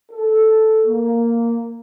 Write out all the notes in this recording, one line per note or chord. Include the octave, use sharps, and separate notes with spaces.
A4
A#3